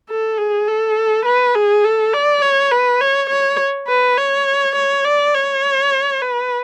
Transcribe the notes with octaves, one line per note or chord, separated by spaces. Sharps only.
A4
G#4
A4
B4
G#4
A4
D5
C#5
B4
C#5
C#5
B4
C#5
C#5
D5
C#5
B4